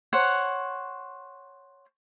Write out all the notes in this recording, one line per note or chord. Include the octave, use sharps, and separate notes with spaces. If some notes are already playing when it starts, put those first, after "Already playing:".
C5 C#5 F#5